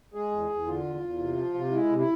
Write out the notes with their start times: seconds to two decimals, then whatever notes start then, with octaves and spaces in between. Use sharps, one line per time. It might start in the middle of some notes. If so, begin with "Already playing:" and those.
0.14 G#3 G#4
0.32 E2
0.49 E2
0.67 D3 F4
0.84 E2
1.02 E2
1.19 C3
1.36 F3
1.54 C3
1.71 G#3 E4
1.89 C3
1.98 E4